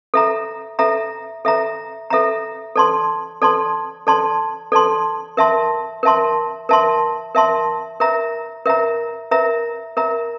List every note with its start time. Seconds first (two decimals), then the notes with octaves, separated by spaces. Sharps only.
0.14 A4 E5 A#5
0.79 A4 E5 A#5
1.45 A4 E5 A#5
2.10 A4 E5 A#5
2.76 A4 D5 A5 C6
3.42 A4 D5 A5 C6
4.07 A4 D5 A5 C6
4.72 A4 D5 A5 C6
5.37 A#4 E5 A5 C6
6.03 A#4 E5 A5 C6
6.69 A#4 E5 A5 C6
7.35 A#4 E5 A5 C6
8.00 A#4 E5 A#5
8.66 A#4 E5 A#5
9.31 A#4 E5 A#5
9.97 A#4 E5 A#5